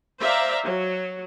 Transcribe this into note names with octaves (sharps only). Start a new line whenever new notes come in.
C5 D5 E5 F5 A#5
F#3